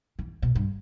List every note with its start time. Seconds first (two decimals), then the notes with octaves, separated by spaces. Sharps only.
0.19 E3
0.42 B2
0.55 G2